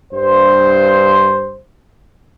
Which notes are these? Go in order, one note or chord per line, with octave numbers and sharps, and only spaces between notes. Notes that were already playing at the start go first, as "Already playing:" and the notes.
G2 C5